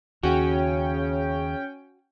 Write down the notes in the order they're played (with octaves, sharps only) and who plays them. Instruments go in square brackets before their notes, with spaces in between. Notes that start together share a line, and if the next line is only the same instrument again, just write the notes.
[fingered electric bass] D#2 [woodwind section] C#3 [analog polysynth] C#4 G5 [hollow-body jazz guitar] F#4